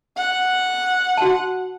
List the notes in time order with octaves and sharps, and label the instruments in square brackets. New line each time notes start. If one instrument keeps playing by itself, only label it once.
[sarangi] F#5
[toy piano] F#4 A5